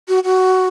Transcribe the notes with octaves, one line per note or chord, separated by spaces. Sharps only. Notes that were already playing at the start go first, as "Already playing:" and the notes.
F#4
F#4